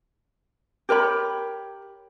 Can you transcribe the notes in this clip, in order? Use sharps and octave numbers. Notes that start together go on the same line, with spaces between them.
G4 A#4 C#5 B5